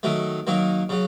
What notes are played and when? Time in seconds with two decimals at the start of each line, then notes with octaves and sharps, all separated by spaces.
0.03 D#3 F#3 A3
0.47 D#3 F#3 A#3
0.89 C#3 F#3